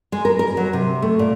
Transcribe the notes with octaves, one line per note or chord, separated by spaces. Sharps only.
G#3
A#4
A#4
F#3
C3
A3
A#2